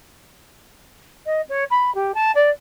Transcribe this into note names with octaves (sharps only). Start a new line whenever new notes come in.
D#5
C#5
B5
G4
A5
D5